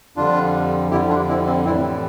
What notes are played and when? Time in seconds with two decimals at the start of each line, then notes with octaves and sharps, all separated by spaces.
0.16 F2 D3 G3 D4 F4
0.91 F2 D3 G3 E4 G4
1.09 D4 F4
1.28 C4 E4
1.47 C4
1.65 A2 E3 G3 C4 E4